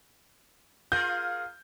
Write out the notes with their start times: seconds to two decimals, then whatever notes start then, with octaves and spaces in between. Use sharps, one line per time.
0.92 F4 G#4 A#4 G6